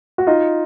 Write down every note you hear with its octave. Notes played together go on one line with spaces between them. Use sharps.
F#4
D#4 F4